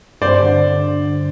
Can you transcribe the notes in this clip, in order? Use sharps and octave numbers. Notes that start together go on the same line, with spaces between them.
G2 C5 D5
D3